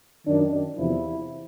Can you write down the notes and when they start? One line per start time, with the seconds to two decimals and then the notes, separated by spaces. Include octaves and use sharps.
0.26 F#2 D#3 D4
0.76 E2 C3 F3 E4